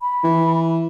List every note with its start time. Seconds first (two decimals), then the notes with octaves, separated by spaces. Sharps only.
0.01 B5
0.24 E3